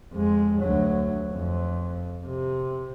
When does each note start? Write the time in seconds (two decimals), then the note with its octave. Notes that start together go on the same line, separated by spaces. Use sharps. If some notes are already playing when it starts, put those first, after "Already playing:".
0.13 F2 G#3
0.62 D2 F#3
1.33 F2
2.27 C3